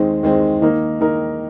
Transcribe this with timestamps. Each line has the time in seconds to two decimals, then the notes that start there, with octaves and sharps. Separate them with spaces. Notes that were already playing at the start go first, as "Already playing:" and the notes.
Already playing: D#2 D#3 G#3 C4
0.23 D#2 D#3 G#3 C4
0.61 D#3 A#3 D#4 A#4
1.00 D#3 A#3 D#4 A#4